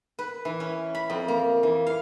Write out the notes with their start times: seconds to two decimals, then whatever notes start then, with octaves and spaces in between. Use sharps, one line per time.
0.19 B4
0.45 E3
0.60 C#4
0.95 B5
1.10 F2
1.28 A#3
1.63 E3
1.87 F5